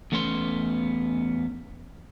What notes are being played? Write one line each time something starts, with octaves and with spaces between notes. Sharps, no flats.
E2 A3 B3 C#4 C6